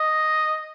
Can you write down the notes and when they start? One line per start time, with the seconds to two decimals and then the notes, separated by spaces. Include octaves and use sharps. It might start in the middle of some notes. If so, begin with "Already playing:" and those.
Already playing: D#5